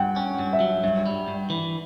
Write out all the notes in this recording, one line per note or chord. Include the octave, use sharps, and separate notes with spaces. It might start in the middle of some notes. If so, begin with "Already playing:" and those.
Already playing: G2 F#5 G5
C#4
G2
E5
F#3
G2 E5
G3
G2
E3